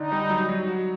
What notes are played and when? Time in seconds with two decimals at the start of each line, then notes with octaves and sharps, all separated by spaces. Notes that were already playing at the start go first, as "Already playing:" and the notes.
Already playing: D3 D#4
0.12 G3
0.30 F#3
0.49 F#3
0.67 F#4